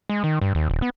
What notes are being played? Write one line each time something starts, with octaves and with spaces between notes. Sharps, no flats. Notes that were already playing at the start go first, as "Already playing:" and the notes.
G#3
D#3
G2
D#2
D#1
B3